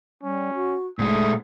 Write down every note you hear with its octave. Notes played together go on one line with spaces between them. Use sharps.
G3 C#4
F#4
F#1 A#2 G#3 A3 D#6